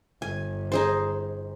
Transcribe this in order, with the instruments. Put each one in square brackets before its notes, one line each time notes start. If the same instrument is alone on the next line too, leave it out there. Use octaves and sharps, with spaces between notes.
[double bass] G1 [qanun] G#5
[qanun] D#4 G#4 C5